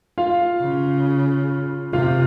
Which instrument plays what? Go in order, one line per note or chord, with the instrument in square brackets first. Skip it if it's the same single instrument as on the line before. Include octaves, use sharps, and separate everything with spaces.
[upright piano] F4 F5
[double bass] C#3
[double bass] C3 [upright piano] F4 F5